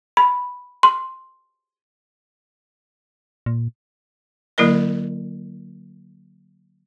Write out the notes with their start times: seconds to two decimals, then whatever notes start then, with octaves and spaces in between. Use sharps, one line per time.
0.17 B5
0.83 C6
3.46 A#2
4.58 D3 F#3 A#3 E4 A#4 D#5